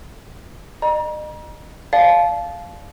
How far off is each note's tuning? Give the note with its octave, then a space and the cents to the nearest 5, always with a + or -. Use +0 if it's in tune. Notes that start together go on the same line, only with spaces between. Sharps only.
D#5 -35 A#5 +35
D5 +5 F5 +0 A5 -30